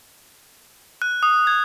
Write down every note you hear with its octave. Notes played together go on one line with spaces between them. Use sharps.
F#6
D#6
G#6